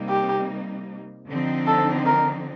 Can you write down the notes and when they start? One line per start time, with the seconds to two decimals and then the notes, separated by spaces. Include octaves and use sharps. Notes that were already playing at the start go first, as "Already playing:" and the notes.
Already playing: C3 G3 A#3 D#4
0.09 G4
1.27 D3 F3 C4 D#4
1.67 A4
2.06 A#4